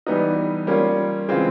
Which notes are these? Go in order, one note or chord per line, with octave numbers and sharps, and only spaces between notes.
E3 G3 B3 D#4
G3 A#3 C#4 F4
C#3 E3 G#3 C4 F4